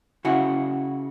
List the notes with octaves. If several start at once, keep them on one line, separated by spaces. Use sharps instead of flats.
C#3 E4 F#4